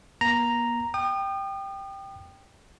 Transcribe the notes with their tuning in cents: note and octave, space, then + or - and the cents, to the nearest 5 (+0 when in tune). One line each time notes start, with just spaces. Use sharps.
A#3 +45 A#5 +0
G5 +0 D#6 -40